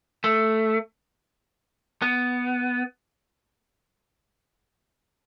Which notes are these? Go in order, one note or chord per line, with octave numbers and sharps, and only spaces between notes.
A3
B3